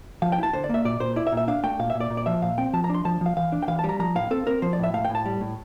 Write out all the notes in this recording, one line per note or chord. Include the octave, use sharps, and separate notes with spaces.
F3 F5
G5
E4 A5
D3 C5
D5
A#3 E5
A#2 D5
A#2 C5
E4 D5
E5
A#2
E5
D4 F5
A3 G5
A#2 F5
E5
A#2
D5
A#2
D5
F3 E5
A#2 F5
C4 G5
F3 A5
A#5
D4 C6
F3 A5
F3 F5
E3 F5
D4
G5
E3 F5
A5
G3
A#5
F3 A#5
A2 F5
C4 A4
C4 A#4
F3 C5
D5
A2
E5
A3 F5
G5
A2
A5
G3
A2